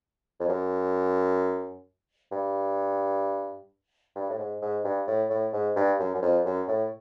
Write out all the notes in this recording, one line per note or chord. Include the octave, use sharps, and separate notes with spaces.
F2
F#2
G2
G2
A2
G#2
G#2
G2
A2
A2
G#2
G2
F#2
F#2
F2
F#2
A2